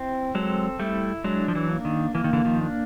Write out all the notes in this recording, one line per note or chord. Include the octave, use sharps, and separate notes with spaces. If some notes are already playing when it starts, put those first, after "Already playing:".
Already playing: C4 E4
F#3 G#3 A4
G3 A3 E4
F#3 G#3 D4
F3
E3 F#3
A#3
D#3
E3 A#3
D#3
D3 E3
D#3 F3
D4